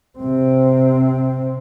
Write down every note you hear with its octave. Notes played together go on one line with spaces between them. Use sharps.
C3 C4